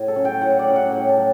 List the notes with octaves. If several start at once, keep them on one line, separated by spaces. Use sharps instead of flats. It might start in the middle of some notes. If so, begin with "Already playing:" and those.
Already playing: A2
A4
F#3 C#4
G5
A2 F#5
D5
F#3 C#4
F#5
A2 G5
A5
F#3